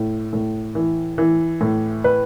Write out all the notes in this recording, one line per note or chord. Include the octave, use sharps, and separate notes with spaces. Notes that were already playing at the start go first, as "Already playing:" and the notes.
Already playing: A2
A2
E3
E3
A2
B4